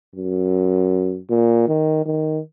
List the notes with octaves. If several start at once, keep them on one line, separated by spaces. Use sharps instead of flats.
F#2
A#2
D#3
D#3